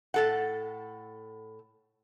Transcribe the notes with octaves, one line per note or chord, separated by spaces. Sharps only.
A2 A4 F#5